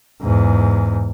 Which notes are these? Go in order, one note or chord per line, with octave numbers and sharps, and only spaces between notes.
E2 G#2